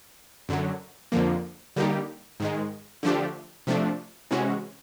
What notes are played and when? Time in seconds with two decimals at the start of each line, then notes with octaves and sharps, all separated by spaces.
0.49 F#2 D3 F#3
1.12 F2 D3 F3 A#3
1.76 D3 G3 A#3 D#4 G4
2.40 G#2 D#3 G#3
3.03 D3 F3 A3 D4 G4
3.67 C3 F3 A3 D4
4.31 C3 E3 G#3 C#4 F#4